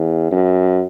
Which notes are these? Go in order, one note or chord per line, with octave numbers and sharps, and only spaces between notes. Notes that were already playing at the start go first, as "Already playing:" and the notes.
Already playing: E2
F#2